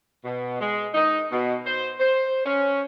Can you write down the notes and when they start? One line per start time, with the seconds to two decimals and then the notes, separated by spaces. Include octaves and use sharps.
0.25 B2
0.61 G#3
0.94 D#4
1.32 B2
1.66 C5
2.00 C5
2.46 C#4